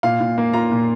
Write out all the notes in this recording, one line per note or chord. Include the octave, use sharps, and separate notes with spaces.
A#2 F5
A#2
A#3
F4 A#5
A#2